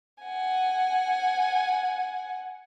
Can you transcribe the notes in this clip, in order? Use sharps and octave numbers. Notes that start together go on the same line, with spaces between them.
F#5 G#5